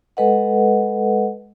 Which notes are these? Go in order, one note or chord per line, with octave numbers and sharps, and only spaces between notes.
G#3 A4 B4 D#5 F#5